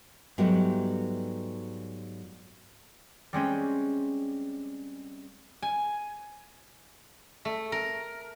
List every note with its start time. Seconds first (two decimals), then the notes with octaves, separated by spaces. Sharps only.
0.38 G#2 F#3 G3 A3 B3 G4
3.33 G3 G#3 C4 C#4
5.62 G#5
7.45 A3
7.72 A#4